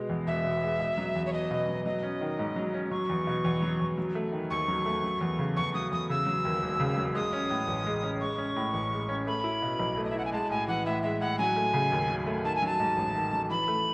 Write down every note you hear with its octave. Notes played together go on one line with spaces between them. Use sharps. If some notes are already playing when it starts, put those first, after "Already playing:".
Already playing: B2 G#3
E2
E1 E5
B2
G#3
B2
F#3
E2
C#5
E1 D#5
B2
F#3
F#3 D#5
C#4
D#3
G#2
F#3
C#4
F#3 C#6
E2
B2
E2
F#3
E2
F#3
A3
D#3
D#2 C#6
F#3
A3
F#3
E2
C#3
E2 C#6
F#3 D#6
E2 D#6
C#3 E6
F#3
D#2
E1
C#3
F#3
G#3 D#6
C#4
A2
A1
G#3
C#4
G#3 C#6
C#4
A2
A1
G#3
C#4
A3 B5
E4
B2
B1
A3
D#5
E5
E4 F#5
G#5
G#3 A5
A2 G#5
E3 F#5
A2 E5
G#3 E5
A2 F#5
F#3 G#5
A3
C#3
D#2
F#3
A3
D#3 A5
G#5
F#3 A5
G#2
A1
D#3
F#3
E3 B5
A3